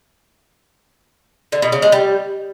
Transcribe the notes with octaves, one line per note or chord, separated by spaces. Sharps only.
D3
B2
C#3
G#3
G3